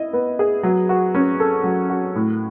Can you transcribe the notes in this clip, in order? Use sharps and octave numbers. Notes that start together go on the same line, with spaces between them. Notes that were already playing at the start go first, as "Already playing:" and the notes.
Already playing: E4 D#5
B3
G#4
F#3
F#4
C#4
A4
F#3
F#4
A2